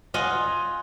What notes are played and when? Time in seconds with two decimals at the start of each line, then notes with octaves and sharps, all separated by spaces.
0.14 F4 D#5 F#5 G#5